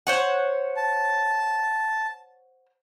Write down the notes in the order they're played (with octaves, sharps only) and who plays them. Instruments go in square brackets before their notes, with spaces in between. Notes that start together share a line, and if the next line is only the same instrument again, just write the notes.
[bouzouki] C5 C#5 F#5
[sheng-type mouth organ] A5